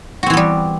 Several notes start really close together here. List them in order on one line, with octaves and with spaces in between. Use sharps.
F#4 C4 E3 B3 G3